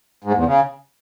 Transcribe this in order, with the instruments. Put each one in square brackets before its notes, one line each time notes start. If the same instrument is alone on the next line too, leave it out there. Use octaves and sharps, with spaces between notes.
[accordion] G#2
E2
C#3